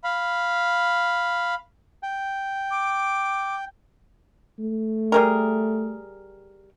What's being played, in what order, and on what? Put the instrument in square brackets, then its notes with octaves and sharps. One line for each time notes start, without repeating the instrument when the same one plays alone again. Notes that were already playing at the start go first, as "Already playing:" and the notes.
[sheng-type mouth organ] F5 B5
[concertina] G5
[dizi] D6
[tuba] A3
[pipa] G3 G#4 A#4